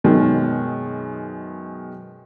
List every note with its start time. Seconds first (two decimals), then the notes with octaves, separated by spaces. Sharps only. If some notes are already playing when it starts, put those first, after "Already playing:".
0.04 F#2 B2 D#3 G#3